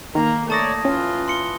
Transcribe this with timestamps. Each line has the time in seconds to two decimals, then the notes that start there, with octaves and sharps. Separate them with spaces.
0.15 D#3 A#3 A#5
0.50 A3 C#5 D5 A5 D#6 A#6
0.85 E3 C#4 F4
1.28 C6 C#7 G7